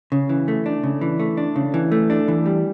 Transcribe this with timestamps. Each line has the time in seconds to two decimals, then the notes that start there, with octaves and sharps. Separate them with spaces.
0.12 C#3
0.29 E3
0.48 A3
0.66 D4
0.83 C#3
1.01 E3
1.20 A3
1.37 D4
1.56 C#3
1.74 E3
1.92 A3
2.10 D4
2.28 E3
2.46 G3